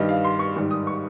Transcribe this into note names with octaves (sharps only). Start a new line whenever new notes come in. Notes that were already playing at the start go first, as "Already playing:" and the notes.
Already playing: G2 D#3 G3 D#5
F5
C6
C#6
G#2 D#3 G3
D#6
C#6